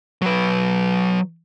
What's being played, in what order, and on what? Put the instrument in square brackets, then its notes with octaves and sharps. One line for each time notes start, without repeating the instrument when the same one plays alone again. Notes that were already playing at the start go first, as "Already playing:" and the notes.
[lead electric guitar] F#3 B4